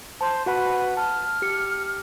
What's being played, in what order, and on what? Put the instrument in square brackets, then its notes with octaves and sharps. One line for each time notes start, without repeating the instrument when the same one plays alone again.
[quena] C5 [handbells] A5
[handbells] F#4 F#5 B5 [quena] B4
[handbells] A5 [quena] F6
[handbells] G4 C#7